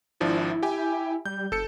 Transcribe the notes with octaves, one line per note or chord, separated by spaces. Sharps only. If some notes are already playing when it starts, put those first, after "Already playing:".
G#1 F3 D4 E4
G4 G5 G#5
G3 G6
F#1 A4 C#7